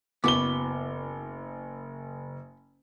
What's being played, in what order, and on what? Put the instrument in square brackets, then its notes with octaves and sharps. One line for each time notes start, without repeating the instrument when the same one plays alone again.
[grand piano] F#1 G7 [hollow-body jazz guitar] B3 E4 F#4 [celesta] D6